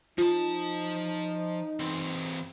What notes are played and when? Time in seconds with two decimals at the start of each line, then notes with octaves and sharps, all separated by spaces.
0.18 F3 D#4 F4 A5
1.80 E3 C4